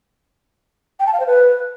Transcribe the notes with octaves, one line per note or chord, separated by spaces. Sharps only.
G5
A5
F5
C5
B4